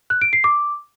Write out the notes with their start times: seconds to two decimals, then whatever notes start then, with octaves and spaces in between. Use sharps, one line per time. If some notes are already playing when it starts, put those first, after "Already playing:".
0.10 F#6
0.22 D7
0.33 C7
0.44 D6